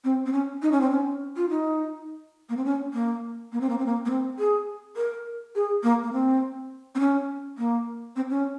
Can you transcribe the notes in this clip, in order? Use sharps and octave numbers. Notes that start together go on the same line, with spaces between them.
C4
C4
C#4
D#4
C#4
C4
C#4
F4
D#4
A#3
C4
C#4
A#3
A#3
C4
A#3
C4
A#3
A#3
C4
G#4
A#4
G#4
A#3
A#3
C4
C4
C#4
A#3
C4
C#4